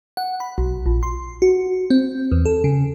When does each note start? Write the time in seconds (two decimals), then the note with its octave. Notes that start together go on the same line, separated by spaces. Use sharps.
0.17 F#5
0.40 B5
0.58 B1
0.86 A#1
1.03 C6
1.42 F#4
1.90 C4
2.32 E2
2.46 A4
2.64 C#3